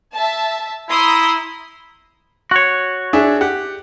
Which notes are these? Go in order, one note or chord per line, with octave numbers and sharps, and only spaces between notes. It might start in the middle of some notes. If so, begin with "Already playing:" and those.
E5 A5
E4 A#5 C6 D#6
F#4 C#5
D4 G#4 E5
G4 F#5